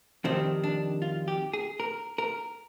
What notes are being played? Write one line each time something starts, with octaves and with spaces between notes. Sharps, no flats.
F2 C3 D#3 G3 C4
D4
F4
G4
G#4
A#4
A#4